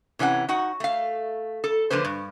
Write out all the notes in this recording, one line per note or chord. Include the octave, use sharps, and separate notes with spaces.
C3 E3 C#4 D4 F#5
D#4 F#4 F#5
A3 F5
A4
D3 F3 A#3 B4 C5
G2